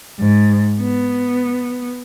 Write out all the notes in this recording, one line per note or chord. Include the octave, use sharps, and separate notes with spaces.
G#2
B3